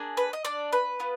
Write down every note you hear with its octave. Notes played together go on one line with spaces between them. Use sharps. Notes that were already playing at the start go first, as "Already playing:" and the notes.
Already playing: A#3 D4 G#4
B4
D#5
D4 D5
B4
B3 F4